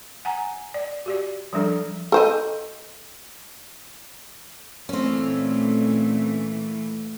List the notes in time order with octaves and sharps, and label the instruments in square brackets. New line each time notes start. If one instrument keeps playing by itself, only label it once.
[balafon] F#5 G#5 A#5
D5
F#4 G4 D5
F3 G3 D4 A4
[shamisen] A4 C5 D#5
[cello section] A#2 E3 A3 [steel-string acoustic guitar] C4 C#4